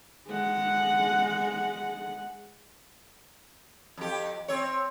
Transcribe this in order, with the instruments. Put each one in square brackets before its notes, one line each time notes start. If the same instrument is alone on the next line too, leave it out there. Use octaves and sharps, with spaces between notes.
[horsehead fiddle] G#3 F#5
[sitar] F2 G4
C4 C#5